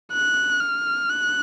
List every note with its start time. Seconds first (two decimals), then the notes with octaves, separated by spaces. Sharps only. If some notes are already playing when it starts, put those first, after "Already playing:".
0.12 F#6
0.60 F6
1.09 F#6